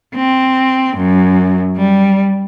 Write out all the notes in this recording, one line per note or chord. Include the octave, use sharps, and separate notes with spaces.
C4
F#2
G3